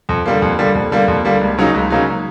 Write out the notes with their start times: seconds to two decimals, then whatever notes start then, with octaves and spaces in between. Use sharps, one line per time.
0.09 F2
0.26 D3 G3 A#3
0.42 F2
0.59 D3 G3 A#3
0.75 F2
0.91 D3 G3 A#3
1.08 F2
1.25 D3 G3 A#3
1.41 C#2
1.58 C#3 F#3 A#3 D#4
1.74 C#2
1.90 C#3 F#3 A#3 D#4